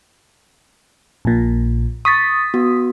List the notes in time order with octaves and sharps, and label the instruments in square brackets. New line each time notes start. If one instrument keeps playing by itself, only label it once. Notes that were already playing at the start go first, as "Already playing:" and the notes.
[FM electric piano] A#1 A#2
[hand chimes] C#6 A6 [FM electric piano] D#6 B6
[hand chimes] B3 F#4